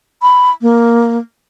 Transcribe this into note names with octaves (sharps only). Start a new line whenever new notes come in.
B5
A#3